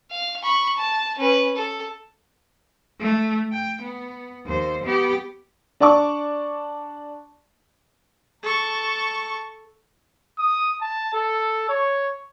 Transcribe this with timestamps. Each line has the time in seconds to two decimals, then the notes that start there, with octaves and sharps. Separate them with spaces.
0.11 F5
0.43 B5 C#6
0.77 A5
1.19 C#4 B4
1.56 A4
3.00 A3
3.52 G5
3.82 B3
4.46 D#2 C5
4.84 B3 G4
5.80 D4 D5 A5 C#6 D6
8.42 A4 A5 C#6
10.39 D#6
10.82 A5
11.13 A4
11.69 C#5